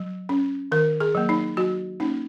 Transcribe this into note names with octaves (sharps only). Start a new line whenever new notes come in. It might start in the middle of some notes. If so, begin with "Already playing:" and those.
Already playing: F#3
C#4
D#3 A#4
G#4
F#3 A#3
D#4
F#3 F#4
A#3 C#4 D#4